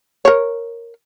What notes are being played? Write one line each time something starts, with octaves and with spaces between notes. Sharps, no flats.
A#4 C#5